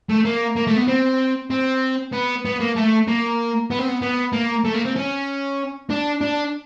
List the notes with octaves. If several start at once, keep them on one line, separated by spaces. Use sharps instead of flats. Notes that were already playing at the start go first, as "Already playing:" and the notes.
A3
A#3
A#3
A3
B3
C4
C4
B3
B3
A#3
A3
A#3
B3
C4
B3
B3
A#3
A3
A#3
C4
C#4
D4
D4